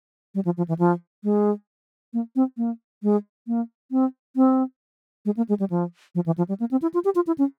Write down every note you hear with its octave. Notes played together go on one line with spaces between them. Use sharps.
G3
F3
F3
E3
F3
G#3
A#3
C4
A#3
G#3
A#3
C4
C4
G#3
A#3
G#3
G3
F3
F3
E3
F3
G3
A#3
C4
E4
F4
G4
F4
E4
C#4